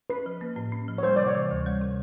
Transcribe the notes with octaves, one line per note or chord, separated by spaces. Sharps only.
C#4 B4
F3
A#3
A2
C#4
F3
C#5
G3 C5
C3 D5
C#5
E3
D2
G3
C3